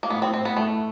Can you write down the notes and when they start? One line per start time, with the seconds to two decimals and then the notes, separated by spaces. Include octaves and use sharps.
0.03 A#3
0.10 A2 B3
0.22 C4
0.33 A2 C4
0.45 B3
0.56 A2 A3